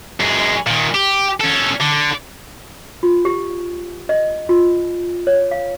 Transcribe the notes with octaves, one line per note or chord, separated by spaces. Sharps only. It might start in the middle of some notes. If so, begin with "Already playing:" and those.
F#2 G#3
A#2 D#3
G4
C#4 A4
D3
F4
G4
D#5
F4
C#5
F5